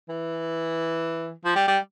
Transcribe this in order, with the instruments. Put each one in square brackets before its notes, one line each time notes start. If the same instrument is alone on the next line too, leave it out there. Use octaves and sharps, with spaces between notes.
[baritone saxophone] E3
F3
G3
G3